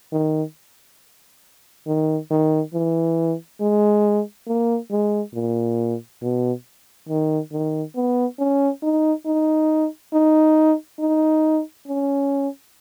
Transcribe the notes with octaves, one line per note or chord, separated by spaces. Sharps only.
D#3
D#3
D#3
E3
G#3
A#3
G#3
A#2
B2
D#3
D#3
B3
C#4
D#4
D#4
D#4
D#4
C#4